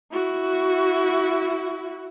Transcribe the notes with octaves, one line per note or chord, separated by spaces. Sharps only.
E4 F#4